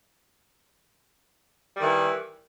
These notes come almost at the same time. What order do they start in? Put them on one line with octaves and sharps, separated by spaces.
G3 D#3 E3